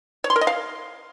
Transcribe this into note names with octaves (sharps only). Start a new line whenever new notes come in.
C#5
C6
A#4
D#5
F5